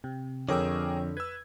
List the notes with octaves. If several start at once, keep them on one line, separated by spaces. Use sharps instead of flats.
C3
F2 D3 G#4 A#4 C#5 G5 D6 E6
B4 E6 G#6